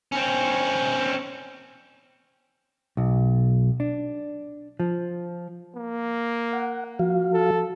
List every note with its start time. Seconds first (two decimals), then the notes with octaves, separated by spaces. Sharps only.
0.12 C4 C#4
2.97 B1
3.80 D4
4.79 F3
5.76 A#3
6.53 F#5
6.99 F3 F#4 F5
7.33 A4